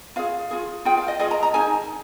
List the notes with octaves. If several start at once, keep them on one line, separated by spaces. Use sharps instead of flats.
F4 G#4 F5
F4 G#4
F4 G#4 G5
F5
D#5
F4 G#4 D#5
A#5
A#5
D#4 G#4 G#5